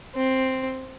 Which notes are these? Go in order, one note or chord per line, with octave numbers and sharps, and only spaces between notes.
C4